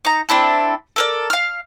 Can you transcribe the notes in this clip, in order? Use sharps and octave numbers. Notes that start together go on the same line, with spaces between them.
D#4 A#5
C4 D4 E4 A4
A4 A#4 D5
F5 F6